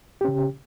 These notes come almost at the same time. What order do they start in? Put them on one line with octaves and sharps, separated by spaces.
G4 C#4 C#3